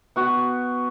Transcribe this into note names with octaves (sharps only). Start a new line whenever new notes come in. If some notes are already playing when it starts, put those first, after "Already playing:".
B3 F#4